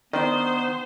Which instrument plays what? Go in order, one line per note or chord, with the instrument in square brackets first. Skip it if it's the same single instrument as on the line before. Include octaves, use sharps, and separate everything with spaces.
[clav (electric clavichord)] D#3 [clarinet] B3 [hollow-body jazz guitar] D4 D5 D#5 [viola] C5